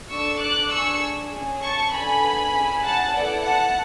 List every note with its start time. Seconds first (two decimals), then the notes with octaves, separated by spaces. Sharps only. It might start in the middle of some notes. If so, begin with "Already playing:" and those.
0.11 D4 A4 C#6 E6
0.41 D6 F#6
0.71 D4 G#4 C#6 E6
1.32 G#4
1.37 C#4
1.62 A5 C#6
1.92 B3 D4 A4 G#5 B5
2.53 C#4 E4 G#4
2.83 F#5 A5
3.13 B3 E4 A4 D5 F#5
3.44 F#5 A5